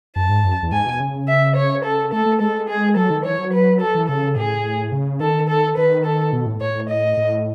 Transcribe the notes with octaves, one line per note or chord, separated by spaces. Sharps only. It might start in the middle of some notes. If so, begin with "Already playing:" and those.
F#2 A5
G#2
F#2
E2
G#2 G#5
B2
C#3
E5
C#5
A4
A3 A4
A3
G#3 A4
G#4
F#3 A4
D#3
E3 C#5
F#3
B4
A4
E3
C#3 A4
A2 G#4
C#3
D#3 A4
A4
D#3 B4
A4
B2
A2
A2 C#5
D#5
A2